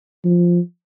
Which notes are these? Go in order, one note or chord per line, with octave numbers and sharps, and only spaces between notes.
F3